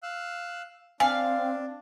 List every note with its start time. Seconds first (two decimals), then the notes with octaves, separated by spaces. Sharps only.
0.03 F5 E6 F#6
1.00 C4 D4 F5 G#5